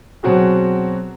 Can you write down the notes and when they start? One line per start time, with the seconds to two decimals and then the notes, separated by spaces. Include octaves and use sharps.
0.23 B2 F#3 C4 F#4 G#4